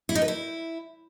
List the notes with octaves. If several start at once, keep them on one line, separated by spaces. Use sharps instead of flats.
E4
D#4
B4
E4